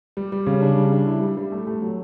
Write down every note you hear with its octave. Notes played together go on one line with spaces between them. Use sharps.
G3
G3
C#3
D4
G3
D4
E4
G3
G3
A3
A3
F#3